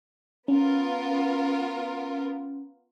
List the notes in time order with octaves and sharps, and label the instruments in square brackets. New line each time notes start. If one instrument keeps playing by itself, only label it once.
[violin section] B3 F4 A#4 [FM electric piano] C#4